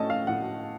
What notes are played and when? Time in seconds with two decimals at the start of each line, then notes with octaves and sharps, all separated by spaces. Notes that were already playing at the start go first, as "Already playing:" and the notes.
Already playing: A2 A3 C#4 D#5 A5
0.10 F5
0.27 A2 F#5